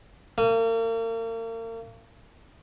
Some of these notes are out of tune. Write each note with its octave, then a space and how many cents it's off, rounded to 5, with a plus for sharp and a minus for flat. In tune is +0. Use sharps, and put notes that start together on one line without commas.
A#3 -40